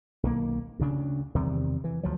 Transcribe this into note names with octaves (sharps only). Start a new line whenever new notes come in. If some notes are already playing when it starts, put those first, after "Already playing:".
B1 D#3 A#3
D2 C#3 D4
E2 C3 D#3 G3
E3
D2 F3 F#3